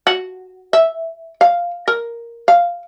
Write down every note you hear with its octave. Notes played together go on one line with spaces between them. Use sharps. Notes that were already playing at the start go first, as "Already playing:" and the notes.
F#4
E5
F5
A#4
F5